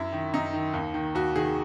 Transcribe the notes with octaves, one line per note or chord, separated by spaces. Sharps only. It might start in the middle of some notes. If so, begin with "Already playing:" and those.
Already playing: F#2 E4
D#3
F#2 D#4
D#3
D#2
D#3
D#2 F#4
D#3 G#4